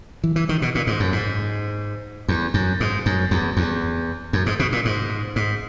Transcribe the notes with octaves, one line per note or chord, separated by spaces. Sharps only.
E3
E3
D#3
B2
A#2
G#2
F#2
G#2
E2
F#2
G#2
F#2
E2
E2
F#2
G#2
B2
A#2
G#2
G#2